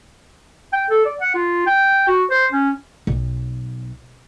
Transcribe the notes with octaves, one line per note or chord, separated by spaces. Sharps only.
G5
A4
D5
F#5
F4
G5
F#4
C5
C#4
B1